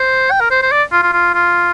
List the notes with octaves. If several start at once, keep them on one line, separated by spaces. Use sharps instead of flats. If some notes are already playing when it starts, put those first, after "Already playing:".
Already playing: C5
G5
A#4
C5
C5
D5
F4
F4
F4
F4